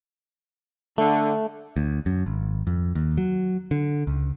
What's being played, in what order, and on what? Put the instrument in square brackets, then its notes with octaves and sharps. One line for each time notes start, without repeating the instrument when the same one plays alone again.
[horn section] D3 [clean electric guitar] A3
[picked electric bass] D2
F#2
G#1
F2
D#2
F#3
D3
C#2